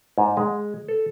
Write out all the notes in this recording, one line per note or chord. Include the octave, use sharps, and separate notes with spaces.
G#2
G#3
A4